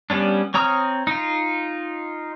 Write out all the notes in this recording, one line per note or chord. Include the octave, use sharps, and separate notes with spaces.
G3 B3 C#4 D4
C4 C#5 A#5 D#6 F6
D#4 F4